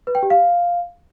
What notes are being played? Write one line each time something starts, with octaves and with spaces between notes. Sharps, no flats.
B4
G5
G4
F5